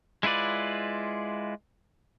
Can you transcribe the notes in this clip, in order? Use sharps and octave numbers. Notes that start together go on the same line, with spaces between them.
G#3 E4 F4 B4 D5